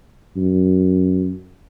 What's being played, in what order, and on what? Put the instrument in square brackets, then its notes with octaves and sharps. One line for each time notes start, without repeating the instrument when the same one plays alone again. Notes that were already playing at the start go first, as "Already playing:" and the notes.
[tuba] F#2